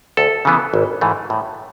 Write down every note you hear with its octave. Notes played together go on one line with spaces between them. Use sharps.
D2 A4
C#3 E3 B3
G#1
G#2 E3 A3
A2